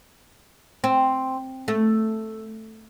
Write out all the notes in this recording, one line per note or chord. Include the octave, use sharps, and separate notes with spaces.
C4
A3